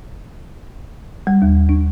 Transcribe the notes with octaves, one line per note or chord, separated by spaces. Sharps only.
G3
D#2
D4